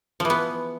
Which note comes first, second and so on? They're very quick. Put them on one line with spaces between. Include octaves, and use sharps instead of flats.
F3 E3 B3